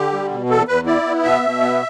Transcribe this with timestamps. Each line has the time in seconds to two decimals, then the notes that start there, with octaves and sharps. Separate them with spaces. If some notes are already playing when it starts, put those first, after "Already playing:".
Already playing: D3 G4
0.12 G3
0.30 B2
0.49 E2 A4
0.68 E2 B4
0.86 E4 D5
1.06 B3
1.24 B2 E5
1.42 B2
1.61 B3